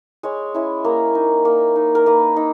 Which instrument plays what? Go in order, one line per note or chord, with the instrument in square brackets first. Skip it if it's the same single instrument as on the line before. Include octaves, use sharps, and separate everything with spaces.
[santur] G#3 C#5
C#4 E4
A#3 A#4
D#4
A#3
D#4
A#4
A#3 B4
D#4